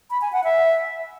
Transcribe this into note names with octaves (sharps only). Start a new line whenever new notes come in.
B5
G#5
F#5
E5